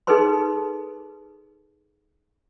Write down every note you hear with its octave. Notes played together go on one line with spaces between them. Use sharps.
D#4 G#4 A4 B4 C5 C6